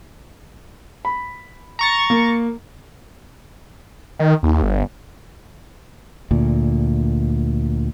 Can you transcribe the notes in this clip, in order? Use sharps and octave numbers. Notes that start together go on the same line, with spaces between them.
B5
A#5 C#6 A6
A#3
D#3
D#2
G1
D2 A#2